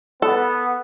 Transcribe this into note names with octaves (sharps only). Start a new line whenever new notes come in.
B3 A4